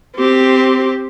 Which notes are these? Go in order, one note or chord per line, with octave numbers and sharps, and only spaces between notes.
C4 G4